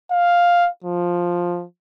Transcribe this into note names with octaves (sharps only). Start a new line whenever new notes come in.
F5
F3